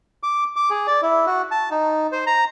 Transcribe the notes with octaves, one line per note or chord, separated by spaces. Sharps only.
D6
D6
G#4
D5
E4
F#4
A5
D#4
C5
A#5